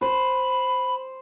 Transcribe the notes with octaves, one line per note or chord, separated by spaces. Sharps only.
C5 B5